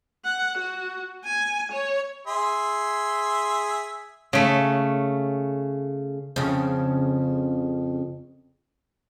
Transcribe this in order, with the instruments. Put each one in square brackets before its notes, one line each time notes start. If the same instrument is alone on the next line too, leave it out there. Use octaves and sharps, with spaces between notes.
[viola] F#5
F#4
G#5
C#5
[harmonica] G#4 E5 C6
[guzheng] C#3 A3
[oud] F2 C#3